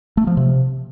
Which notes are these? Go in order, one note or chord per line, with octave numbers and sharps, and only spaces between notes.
A3
F3
C3